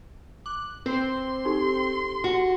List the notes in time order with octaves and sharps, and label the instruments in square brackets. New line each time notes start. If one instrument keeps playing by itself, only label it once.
[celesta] D6 [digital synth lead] F#6
[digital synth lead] C4 [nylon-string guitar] C5 [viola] C6
[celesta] D#4 G4 A4
[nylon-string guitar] F#4